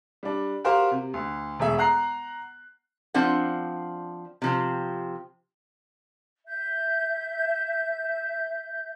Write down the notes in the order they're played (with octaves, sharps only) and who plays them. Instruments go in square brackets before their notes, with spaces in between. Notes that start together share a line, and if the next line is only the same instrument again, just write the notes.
[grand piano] G3 D4
F#4 G4 A#4 C5 F5
C3
D2
E1 A3 G#4 E5
F#5 A#5 F#6 C7
[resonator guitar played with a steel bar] F3 C4 D4 C5 F#5
C3 F3 C4
[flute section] E5 G6